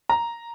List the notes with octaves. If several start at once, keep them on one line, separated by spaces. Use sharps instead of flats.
A#5